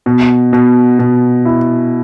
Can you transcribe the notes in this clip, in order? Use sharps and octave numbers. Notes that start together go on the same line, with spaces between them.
B2
B2
B2
E4